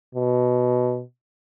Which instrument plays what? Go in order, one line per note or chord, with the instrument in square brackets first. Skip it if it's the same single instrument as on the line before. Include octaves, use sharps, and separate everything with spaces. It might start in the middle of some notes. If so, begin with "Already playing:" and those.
[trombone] B2